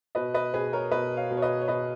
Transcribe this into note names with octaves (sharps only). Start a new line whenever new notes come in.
B2 B4 D#5
B4 D#5
B2 G#4 B4
A#4 C#5
B2 B4 D#5
C#5 F5
B2
C#5
B4 D#5
C#5
B2 B4 D#5